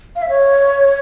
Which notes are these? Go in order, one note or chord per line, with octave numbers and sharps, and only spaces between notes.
F5
E5
C#5